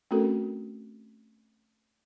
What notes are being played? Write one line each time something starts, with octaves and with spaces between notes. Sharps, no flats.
A3 C4 C#4 F#4 A4 A#4